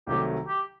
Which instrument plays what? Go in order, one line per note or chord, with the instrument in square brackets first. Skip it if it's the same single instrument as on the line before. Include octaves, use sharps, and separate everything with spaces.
[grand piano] C2 C3 D#3 F#3 A3 [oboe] G4
[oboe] G4